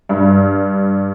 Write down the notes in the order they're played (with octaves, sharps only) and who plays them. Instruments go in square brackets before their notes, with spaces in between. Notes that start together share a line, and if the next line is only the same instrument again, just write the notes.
[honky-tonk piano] G2